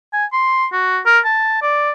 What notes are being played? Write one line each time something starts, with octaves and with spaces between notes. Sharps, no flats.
G#5
C6
F#4
A#4
A5
D5